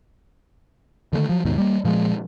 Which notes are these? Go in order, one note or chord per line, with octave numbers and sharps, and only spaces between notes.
D3 D#3 G3 A3
F3 F#3
D#2 G#2 B2 D#3
G3 A#3
A#2 F3 G3 G#3